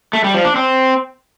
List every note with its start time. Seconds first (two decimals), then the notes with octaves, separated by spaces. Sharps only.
0.13 A3
0.24 G3
0.34 F3
0.45 D4
0.55 C4